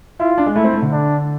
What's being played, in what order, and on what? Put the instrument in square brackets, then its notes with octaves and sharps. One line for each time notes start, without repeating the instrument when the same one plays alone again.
[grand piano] E4 [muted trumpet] F4
[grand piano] D4
G#3
[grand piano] A3 [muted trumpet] E4
[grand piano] C4
A3
D3
[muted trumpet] D4